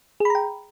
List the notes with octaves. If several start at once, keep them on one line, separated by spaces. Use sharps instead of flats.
G#4 G5 A#5 B5